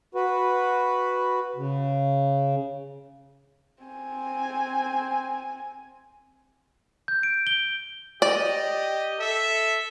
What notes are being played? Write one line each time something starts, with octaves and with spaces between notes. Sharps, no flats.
F#4 B4
C#3
C4 G#5
G6
D7
G7
G4 D5 D#5
A4 E5